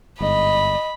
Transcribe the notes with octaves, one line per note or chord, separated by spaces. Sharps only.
G1 G#2 D#5 B5